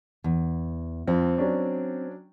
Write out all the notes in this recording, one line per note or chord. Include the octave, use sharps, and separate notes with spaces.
E2
F2 C4
F#3 C#4 D4